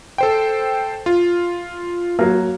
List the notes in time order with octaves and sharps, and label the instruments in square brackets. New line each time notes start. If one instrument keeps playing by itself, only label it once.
[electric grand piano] A4 C5 G5
F4
[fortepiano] F#3 A#3